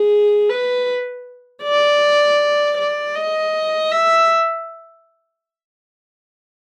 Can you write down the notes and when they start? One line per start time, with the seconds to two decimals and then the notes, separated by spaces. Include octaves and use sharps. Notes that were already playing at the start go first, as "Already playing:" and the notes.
Already playing: G#4
0.50 B4
1.64 D5
2.78 D5
3.15 D#5
3.91 E5